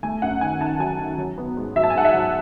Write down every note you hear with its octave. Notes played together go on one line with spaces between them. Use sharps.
A3 G#5
F#2 F#5
D#3 G#5
D#3 A5
F#3 G#5
D#3
F#3
B3
G#2
F#3 E5
A5
G#5
G#2 F#5
E5
F#3